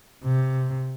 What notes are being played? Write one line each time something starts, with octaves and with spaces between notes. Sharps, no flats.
C3